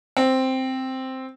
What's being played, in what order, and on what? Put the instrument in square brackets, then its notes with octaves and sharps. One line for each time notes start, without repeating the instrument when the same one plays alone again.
[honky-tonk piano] C4